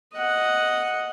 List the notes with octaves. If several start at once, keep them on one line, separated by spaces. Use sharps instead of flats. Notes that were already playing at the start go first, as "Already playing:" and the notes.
D#5 F#5